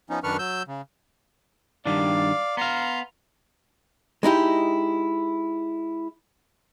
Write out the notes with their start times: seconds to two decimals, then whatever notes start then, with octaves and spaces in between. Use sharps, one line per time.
0.10 F3 B3 C#4 D#4
0.24 F#2 D#3 D4 B4 C#6 F6
0.39 F#3 E6 G6
0.68 C#3
1.86 G2 D#3 D4 D5 F5
2.57 B3 F5 A#5 C6
4.23 G#3 D#4 E4 G4